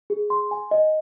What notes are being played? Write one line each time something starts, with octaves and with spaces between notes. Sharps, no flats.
G#4
C6
G#5
D#5